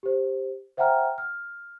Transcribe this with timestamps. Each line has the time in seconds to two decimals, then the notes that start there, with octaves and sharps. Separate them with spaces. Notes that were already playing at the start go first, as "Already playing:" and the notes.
0.03 G4 C5
0.77 C5 E5 F#5 G5 A#5 F6
1.18 F6